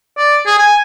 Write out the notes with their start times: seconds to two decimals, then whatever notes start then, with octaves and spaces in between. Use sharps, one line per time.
0.18 D5
0.47 G#4
0.59 G#5